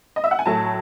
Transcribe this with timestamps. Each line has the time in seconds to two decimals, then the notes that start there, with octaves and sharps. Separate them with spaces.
0.16 D#5
0.24 E5
0.31 F#5
0.39 G#5
0.45 A2 F#3 A3 A5